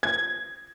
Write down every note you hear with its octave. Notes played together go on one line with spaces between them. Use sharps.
G#6